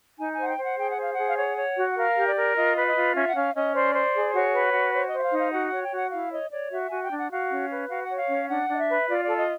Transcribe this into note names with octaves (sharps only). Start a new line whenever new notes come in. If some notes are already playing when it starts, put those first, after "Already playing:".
D#4 G#5
G#5
C5 F#5
G5
C5 F#5
G#4 G5
F#5
C5 F5
G#4 F#5
F5
C#5 F#5
C#5
F#4
F#5
A#4 F5
G4
D5
A#4
F4 D#5
B4
D#5
F4
C#4 E5
F#5
C#4 F5
C#4 D#5
C5 D5
C5
G#4
F#4 C#5
B4
F#4
C5 C#5
C5 D#5
E5
F5
D#4
F5
F#4 F#5
F#5
C#5
G5
F#4 F#5
E4 F5
C#5 D#5
C#5 D5
F#4 E5
F#4 G#5
G5
D4
F#5
F#4 F5
C#4
B4
F#4 F5
F#5
C#5
F5
C#4
D4 F#5
D4 D#5
E5
B4
F4 D5
A4 D5
D#5